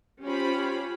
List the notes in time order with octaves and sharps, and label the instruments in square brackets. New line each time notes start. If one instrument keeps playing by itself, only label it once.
[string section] C#4 F4 G4 C5 B5